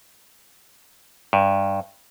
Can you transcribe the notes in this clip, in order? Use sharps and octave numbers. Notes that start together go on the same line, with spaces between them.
G2